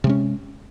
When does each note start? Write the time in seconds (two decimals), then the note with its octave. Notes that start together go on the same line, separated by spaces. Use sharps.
0.04 C3
0.07 G#3
0.09 C#4